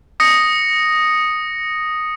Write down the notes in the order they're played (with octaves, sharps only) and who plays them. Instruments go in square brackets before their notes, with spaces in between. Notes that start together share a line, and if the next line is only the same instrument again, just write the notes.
[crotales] D#6 A#6 C#7